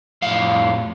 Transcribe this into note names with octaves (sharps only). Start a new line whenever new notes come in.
F2 A2 F5